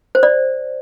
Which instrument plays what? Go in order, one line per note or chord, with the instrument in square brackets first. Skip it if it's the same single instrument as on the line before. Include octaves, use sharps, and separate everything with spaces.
[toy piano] C5
D5